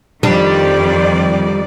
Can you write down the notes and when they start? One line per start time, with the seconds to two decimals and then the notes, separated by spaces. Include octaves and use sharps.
0.23 F2 D#3 G3 D4 D5